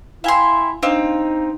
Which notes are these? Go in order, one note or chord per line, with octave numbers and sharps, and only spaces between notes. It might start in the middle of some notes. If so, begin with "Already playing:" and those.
E4 E5 F5 G5 G#5 C6
C4 D4 D#4 D#5 F5